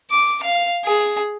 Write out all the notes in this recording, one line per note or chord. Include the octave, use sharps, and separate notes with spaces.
D6
F5
G#4